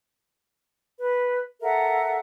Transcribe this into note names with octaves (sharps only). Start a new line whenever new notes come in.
B4
A4 A#4 E5 F#5